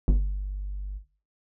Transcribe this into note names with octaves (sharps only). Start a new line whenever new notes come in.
G1